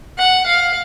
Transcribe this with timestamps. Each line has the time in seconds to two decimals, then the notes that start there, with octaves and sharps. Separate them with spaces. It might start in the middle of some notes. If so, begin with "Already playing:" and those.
0.18 F#5
0.46 F5